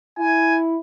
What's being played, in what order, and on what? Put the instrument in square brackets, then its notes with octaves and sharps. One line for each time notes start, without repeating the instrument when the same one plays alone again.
[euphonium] E4 [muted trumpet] G#5